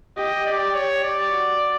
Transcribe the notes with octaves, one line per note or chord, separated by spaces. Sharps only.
G4 D#5
D5
C#5
G4 D5
F#4